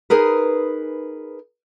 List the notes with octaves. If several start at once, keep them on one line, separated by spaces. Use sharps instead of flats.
D#4 G#4 A#4 B4